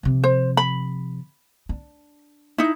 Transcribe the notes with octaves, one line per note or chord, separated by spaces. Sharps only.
C3 F3
C5
B5
D4
D#4 E4